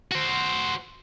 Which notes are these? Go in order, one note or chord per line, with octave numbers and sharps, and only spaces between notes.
F#4 C5